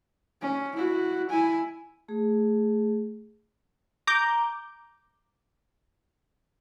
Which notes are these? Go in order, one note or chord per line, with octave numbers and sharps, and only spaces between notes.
C#4
E4 F#4
E4 G#5
A3 G#4
A#5 D6 G6